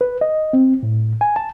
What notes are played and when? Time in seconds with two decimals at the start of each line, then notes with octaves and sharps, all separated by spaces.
0.01 B4
0.21 D#5
0.53 C4
0.83 A2
1.21 G#5
1.36 A5